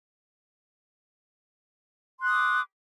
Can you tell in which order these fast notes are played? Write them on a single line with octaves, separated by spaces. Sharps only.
C6 F#6 D#6 D6